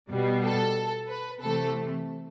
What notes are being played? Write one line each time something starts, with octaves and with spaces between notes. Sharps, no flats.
B2 G3 B3
A4
B4
C3 E3 A3 A4